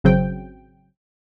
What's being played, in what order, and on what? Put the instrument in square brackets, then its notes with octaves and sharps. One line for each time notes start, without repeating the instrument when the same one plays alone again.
[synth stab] G#1 C#3 F#3 C4 G5